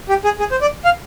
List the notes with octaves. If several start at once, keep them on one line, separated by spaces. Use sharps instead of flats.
G4
G#4
G#4
C5
D5
F5